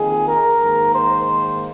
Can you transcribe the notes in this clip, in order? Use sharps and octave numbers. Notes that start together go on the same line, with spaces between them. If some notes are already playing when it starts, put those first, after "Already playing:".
Already playing: F2 D#3 A#3 G#4
A#4
G#2 D#3 A#3
C5